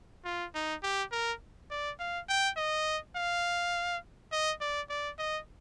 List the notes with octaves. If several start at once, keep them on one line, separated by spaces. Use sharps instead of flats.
F4
D#4
G4
A#4
D5
F5
G5
D#5
F5
D#5
D5
D5
D#5